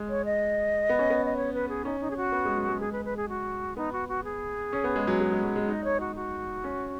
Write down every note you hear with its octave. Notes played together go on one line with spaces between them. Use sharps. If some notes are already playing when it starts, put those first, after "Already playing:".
Already playing: G#3
C#5
D#5
B3
C#4
B3
D#5
C#5
B4
G#4
C#4 D#4
D#4
G#4
F#4
B3
G#3
F#3
G#3
G#3 G#4
B4
B4
G#4
F#4
B3 D#4
F#4
F#4
G#4
C#4
B3
G#3
F#3
G#3
G#3
F#3
G#3
D#4 D#5
C#5
F#4
F#4
C#4